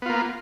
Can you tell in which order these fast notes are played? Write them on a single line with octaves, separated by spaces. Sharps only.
B3 F4 A#3